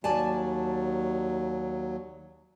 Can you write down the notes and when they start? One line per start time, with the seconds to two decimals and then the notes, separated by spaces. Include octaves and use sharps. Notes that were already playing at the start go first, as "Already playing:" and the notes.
0.04 D#2 F#3 D5 G#5 A5